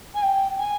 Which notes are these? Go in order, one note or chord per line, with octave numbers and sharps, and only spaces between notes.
G#5
G5
G#5